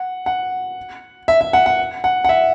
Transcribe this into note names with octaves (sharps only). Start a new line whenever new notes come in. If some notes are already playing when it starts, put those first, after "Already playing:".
Already playing: F#5
F#5
E5
E5
F#5
F#5
F#5
F#5
E5